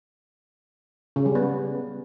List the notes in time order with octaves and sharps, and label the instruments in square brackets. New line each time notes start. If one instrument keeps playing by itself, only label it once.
[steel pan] C#3
G3
B3